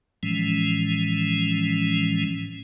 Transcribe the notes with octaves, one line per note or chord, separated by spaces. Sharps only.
A2 E3 F3 G#3 C#4